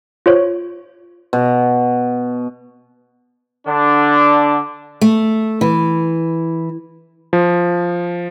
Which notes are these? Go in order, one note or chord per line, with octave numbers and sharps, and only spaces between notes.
F4 C5 C#5
B2
D3 D4
A3
E3
F3